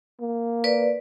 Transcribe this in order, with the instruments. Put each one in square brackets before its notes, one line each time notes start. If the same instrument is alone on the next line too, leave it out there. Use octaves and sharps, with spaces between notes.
[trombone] A#3
[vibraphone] B4 D5